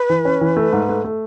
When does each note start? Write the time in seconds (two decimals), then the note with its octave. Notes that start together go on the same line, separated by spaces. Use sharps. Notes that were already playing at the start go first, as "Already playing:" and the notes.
Already playing: B4
0.10 E3
0.25 C#4
0.41 E3
0.57 A3
0.73 G#2
0.89 A3
1.04 A3